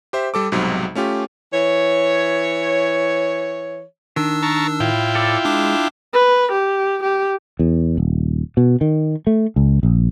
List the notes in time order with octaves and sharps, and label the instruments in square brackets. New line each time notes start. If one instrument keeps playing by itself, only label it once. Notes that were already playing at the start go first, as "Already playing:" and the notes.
[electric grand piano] G4 C5 E5
G3 A4 D6
B1 G#2 C3 F#3 G3
A3 C#4 F4 G4
[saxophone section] E3 C#5
[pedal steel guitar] D#3 [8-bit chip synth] D4 E6
[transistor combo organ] A#4 A5 C#6
[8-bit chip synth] A2 [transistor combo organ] E4 F4 G5
[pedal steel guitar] A4 D5
[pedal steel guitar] G#3 [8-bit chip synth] D4 D6
[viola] B4
G4
G4
[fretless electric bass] E2
D#1
B2
D#3
A3
C#2
A#1